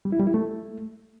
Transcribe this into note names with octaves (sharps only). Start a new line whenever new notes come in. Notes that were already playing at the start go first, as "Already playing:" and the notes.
G3
E4
G3
E4
A3